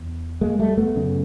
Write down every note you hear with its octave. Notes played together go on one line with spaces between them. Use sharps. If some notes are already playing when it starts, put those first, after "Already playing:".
Already playing: E2
G#3 A#3
G3 A3
A3 B3
F#2 C#3